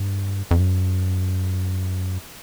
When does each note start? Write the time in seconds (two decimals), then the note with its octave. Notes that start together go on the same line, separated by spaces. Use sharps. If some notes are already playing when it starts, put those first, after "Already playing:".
Already playing: G2
0.51 F2
0.60 F#2